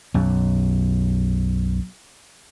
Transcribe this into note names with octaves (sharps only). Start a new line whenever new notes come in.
B1 F#2